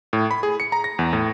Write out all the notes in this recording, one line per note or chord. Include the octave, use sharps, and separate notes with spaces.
A2
B5
G#4
C#7
A#5
A#6
E2
A2